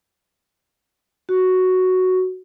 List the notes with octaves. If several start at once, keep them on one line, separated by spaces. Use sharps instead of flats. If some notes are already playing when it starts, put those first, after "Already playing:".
F#4